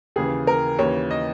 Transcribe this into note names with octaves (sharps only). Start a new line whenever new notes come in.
D#2 C#3 E3 G#4
A#4
D#2 C#3 E3 C#5
D#5